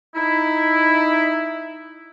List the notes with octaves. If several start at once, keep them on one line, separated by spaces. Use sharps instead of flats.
D#4 E4